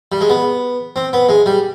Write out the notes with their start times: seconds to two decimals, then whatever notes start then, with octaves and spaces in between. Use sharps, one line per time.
0.12 G3
0.21 G#3
0.30 B3
0.96 C4
1.13 B3
1.29 G#3
1.46 G3